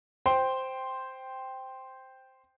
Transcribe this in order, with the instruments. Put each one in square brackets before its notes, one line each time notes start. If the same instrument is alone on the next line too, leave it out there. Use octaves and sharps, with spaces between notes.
[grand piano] C5 G5 C6